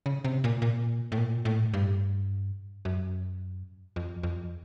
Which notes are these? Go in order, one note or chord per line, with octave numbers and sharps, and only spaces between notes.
C#3
C3
A#2
A#2
A2
A#2
A2
G2
F#2
F2
F2